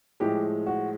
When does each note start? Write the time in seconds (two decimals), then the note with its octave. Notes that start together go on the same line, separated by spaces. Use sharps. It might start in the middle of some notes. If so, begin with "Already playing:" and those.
0.20 A2 F3 G#3 G4
0.67 F#4